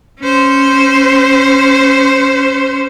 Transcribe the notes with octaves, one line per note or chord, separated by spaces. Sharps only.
C#4 C5